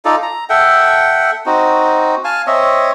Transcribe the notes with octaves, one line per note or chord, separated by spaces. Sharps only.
D#4 F4 A4 D5
A#5
A4 E5 F#5 G5
C4 D#4 F#4
F5 G#5 A5
C4 C#5 D#5 E5